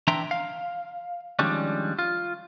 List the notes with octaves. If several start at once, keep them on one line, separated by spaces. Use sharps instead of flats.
E3 D4 E5 G5 A#5 C6
F5
D#3 F3 G3 G#3 C#4 D4
F4